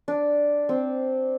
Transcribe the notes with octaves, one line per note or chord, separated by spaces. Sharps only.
D4
C4